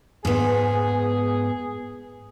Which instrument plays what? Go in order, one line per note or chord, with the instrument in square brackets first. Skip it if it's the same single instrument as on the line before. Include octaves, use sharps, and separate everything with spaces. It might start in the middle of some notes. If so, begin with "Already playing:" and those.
[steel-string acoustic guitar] G#2 B3 [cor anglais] G#4